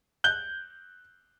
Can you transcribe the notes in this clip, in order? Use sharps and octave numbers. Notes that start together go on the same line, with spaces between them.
F#6 G6 G7